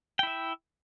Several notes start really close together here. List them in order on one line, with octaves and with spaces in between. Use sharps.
G5 E4 E5